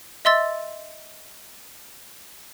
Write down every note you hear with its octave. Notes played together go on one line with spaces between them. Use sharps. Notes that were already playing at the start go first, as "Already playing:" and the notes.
D#5 E5 C6 E6 A6